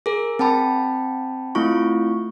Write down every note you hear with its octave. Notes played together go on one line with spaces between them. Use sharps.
G#4 A#4
C4 G5 A5 B5
A3 C4 E4 F4 C#6